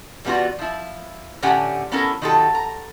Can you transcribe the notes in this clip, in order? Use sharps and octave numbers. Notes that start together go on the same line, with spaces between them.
E3 G3 B3 C#4 F4 F#4
F3 E4
A2 D3 C#4 G4 F#5 G#5
B3 C#4 E4 A4 A#4
D#3 F#3 F4 G4 A4
A#5